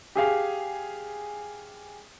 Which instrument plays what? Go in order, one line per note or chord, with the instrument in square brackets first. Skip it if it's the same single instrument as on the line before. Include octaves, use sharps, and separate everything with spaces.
[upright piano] G4 G#4 F5